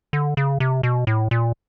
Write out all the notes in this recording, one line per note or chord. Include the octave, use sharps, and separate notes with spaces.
D3
C#3
C3
B2
A2
A#2